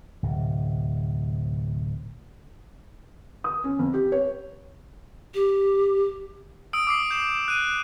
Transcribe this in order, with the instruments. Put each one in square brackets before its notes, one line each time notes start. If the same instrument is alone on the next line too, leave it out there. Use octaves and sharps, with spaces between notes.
[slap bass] D1 C3
[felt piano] D#6
C#4
F2
G4
C#5
[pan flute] G4
[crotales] D#6 E6 D7
D6 D#6 C7
G6 E7
F#6 D#7